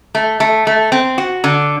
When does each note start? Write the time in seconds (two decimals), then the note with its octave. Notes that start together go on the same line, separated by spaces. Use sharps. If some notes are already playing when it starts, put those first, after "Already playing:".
0.15 A3
0.40 A3
0.67 A3
0.92 C4
1.18 F#4
1.44 D3